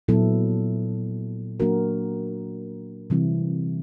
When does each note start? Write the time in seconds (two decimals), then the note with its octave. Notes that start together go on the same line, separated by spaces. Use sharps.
0.08 A#2 F#3 B3 E4 A4
1.60 F#3 A#3 D4 F#4 A#4
3.10 C3 E3 G3 C4 E4